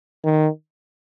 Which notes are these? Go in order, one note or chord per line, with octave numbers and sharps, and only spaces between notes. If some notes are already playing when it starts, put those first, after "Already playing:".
D#3